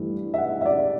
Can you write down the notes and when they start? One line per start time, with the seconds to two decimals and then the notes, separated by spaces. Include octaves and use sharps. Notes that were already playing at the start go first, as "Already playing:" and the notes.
Already playing: G2 E3 A3 E4
0.34 E5
0.38 F#5
0.61 E5
0.66 D5